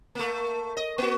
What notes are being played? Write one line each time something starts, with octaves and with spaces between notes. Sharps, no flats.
A3 A#3
D#5
A#3 F#4